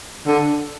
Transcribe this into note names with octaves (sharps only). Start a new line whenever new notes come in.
D3